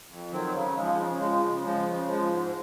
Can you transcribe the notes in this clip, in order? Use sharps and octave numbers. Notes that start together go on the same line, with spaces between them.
F2
D#3 F#3 C4
C#3
F3 G#3
C#3
F3 G#3
C#3
F3 G#3
C#3
F3 G#3
G#2